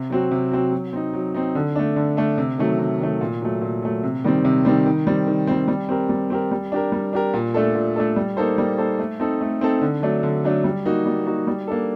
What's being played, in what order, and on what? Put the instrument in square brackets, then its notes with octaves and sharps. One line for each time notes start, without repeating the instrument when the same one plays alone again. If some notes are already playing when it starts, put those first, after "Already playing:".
Already playing: [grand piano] C3
F#3 C4 F#4
C3
F#3 C4 F#4
F#3
C4 D#4
F#3
C4 D#4
D3
A3 D4
D3
A3 D4
C3
D#3 F#3 A3
C3
D#3 F#3 A3
A#2
F#3 A3
A#2
F#3 A3
C3
D#3 G3 C4
C3
D#3 G3 C4
D#3
G3 C4
D#3
G3 C4
G3
C4 G4 A#4
G3
C4 G4 A#4
G3
D4 G4 A#4
G3
D4 G4 A#4
A#2
A3 D4 A4
A#2
A3 D4 A4
G3
A#3 D#4 A4 C5
G3
A#3 D#4 A4 C5
A3
C4 D#4 A4
A3
C4 D#4 A4
D3
F#3 A3 D4
D3
F#3 A3 D4
G3
A#3 D#4 F#4
G3
A#3 D#4 F#4
G3
A#3 D4 A4